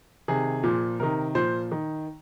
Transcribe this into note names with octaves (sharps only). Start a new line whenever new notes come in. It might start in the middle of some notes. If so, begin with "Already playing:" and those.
C3 D#3 G#4
A#2 F3
C3 D#3 A#4
A#2 F3 C5
D#3